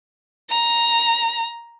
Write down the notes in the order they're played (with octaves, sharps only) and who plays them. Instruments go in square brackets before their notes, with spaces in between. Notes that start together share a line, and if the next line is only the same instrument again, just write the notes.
[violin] A#5